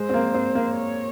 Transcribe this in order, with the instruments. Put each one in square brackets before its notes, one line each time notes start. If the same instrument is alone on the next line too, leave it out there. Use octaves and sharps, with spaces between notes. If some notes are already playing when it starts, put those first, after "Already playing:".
Already playing: [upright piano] G#3 [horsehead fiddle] C5
[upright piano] C4
A#3
C4
A#3
[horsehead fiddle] C#5